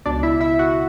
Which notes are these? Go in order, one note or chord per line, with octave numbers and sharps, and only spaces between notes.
C#2 B2 D4 D5
E4 E5
E4 E5
F#4 F#5